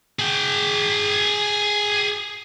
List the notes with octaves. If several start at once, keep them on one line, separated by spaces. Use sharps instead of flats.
G#4 G5